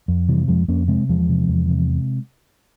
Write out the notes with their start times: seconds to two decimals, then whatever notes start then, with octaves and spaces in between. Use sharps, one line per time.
0.08 F2
0.29 C3 E3 G3
0.48 F2 F3 G#3
0.68 F2 A#3 C#4
0.88 C3 G#3 C4
1.09 E2 F3 G#3
1.29 C3
1.48 E2
1.69 C3